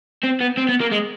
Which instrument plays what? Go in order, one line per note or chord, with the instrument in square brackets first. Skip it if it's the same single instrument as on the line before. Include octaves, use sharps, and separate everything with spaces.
[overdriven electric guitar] C4
B3
C4
B3
A#3
G#3